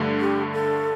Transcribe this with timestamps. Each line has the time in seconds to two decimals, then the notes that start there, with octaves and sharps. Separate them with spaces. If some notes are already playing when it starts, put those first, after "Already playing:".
Already playing: G2 D3 A3
0.20 G4
0.53 A4